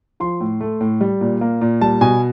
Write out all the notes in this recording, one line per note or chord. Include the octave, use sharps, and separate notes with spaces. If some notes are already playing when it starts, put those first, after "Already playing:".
F3 C6
A2
A3
A2
G3
A#2
A#3
A#2
G3 A5
B2 G#5